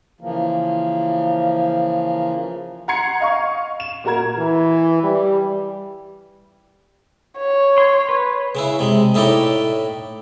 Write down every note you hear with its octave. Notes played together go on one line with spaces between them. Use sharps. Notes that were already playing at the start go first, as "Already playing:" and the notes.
C#3 E3 F3 A#3
F#5 A#5 C6 G#6 C7 C#7
D#5 F5 C#6
E7
A#2 A#3 F#4 A#4 A#5 G#6
E3
G3
C#5
C6
B4
C#3 C#4 E4
C3 G#3
A2 D#4 E4 C#5 D5 G5